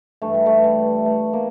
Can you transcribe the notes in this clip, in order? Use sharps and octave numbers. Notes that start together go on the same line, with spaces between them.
G2 E3 A3
G3
A3
G3
A3
A#3